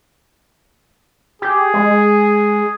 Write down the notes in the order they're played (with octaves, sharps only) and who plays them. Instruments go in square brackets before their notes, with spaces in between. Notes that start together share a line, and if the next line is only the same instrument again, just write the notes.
[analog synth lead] G4 [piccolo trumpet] G#4
[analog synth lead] G#3